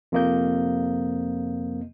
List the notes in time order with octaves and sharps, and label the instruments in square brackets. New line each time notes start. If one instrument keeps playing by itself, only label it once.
[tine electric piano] F2 C3 A#3 D#5 G6